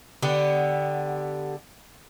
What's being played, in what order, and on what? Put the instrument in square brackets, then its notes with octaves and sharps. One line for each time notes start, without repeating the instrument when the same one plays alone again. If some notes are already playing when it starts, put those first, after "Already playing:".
[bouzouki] D3 B3 G4